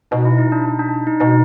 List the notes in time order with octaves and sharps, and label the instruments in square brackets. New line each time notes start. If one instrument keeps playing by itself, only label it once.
[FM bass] B2 [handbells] D#4
[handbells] E4
D#4
D4
D#4
D4
D#4
D#4
[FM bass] B2 [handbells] D#4